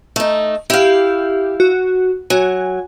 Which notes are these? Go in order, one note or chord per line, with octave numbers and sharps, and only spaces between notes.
A3 D#4
E4 G4 F5
F#4
F#3 F#4 G#5